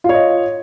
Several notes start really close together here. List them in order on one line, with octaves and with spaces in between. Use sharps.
F4 C#5 D#5